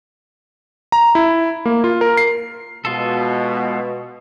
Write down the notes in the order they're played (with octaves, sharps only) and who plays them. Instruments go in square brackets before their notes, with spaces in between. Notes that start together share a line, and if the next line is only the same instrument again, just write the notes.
[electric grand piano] A#5
E4
A#3
F4
A#4
C7
[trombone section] B2 [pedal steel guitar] G#3 F4 A4